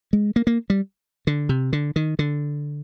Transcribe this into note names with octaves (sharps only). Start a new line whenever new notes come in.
G#3
A#3
A#3
G3
D3
C3
D3
D#3
D3